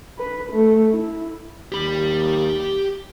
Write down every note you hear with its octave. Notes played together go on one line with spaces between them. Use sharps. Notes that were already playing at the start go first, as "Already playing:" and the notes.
B4
A3
E4
D#2 G4 B5